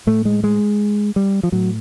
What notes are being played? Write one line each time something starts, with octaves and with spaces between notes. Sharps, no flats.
A2 A3
G#3
G#3
G3
F3
A2 F#3